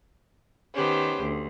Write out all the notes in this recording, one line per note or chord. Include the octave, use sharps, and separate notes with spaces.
D#3 B3 C#4 G4 C5
D2